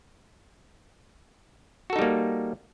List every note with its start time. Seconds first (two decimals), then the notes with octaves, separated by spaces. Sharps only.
1.90 F#4
1.93 A4
1.96 D#4
1.99 G3
2.02 A#3